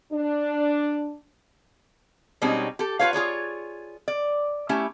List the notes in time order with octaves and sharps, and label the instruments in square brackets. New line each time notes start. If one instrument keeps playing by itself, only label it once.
[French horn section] D4
[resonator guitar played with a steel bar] B2 G3 G#3 C4 C#4 D#4
G4 A4
F4 B4 C#5 F5
F4 G#4 C#5 D5
D5
A3 C#4 E4 G4